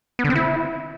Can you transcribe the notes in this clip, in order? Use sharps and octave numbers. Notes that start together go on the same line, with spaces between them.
B3
D3
C4
E4